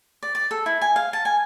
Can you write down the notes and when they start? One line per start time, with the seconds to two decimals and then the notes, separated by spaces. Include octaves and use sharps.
0.23 D5
0.35 D5
0.51 A4
0.66 E4
0.81 G#5
0.96 F5
1.13 A5
1.25 G#5